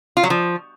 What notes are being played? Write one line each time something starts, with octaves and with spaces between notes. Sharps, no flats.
F4
F#3
F3